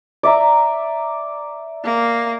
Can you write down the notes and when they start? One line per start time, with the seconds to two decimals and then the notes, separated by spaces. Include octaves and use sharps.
0.23 D5 E5 A#5
1.84 A#3